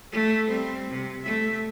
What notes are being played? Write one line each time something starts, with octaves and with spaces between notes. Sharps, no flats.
A3
G3 C4
C3
A3 E5